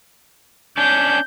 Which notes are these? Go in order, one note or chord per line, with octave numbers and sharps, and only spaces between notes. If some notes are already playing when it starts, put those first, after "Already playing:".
C#4 D4 G6